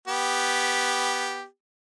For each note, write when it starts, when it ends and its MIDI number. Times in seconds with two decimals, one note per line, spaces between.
0.08 1.45 59
0.08 1.45 67